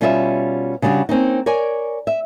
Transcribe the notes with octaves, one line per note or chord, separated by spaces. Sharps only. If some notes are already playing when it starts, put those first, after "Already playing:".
B2 G3 C#4 F4 D#5 E5
C#3 G3 D4 F#4 G4
A#3 C4 C#4 D#4
A#4 C#5 D5 G#5
E5